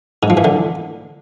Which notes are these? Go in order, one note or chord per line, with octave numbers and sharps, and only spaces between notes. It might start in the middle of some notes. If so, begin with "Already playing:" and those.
G#2
F3
E3
D3